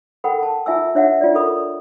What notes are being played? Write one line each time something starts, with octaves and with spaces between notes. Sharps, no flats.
A4 A#4 F#5 G5 B5
A5
F4 E5 G#5 E6
D4 C#5 E5 F#5
F4 D5
A4 A#4 B5 D#6